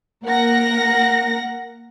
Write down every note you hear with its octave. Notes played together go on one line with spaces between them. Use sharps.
A#3 A#4 F#5 A#6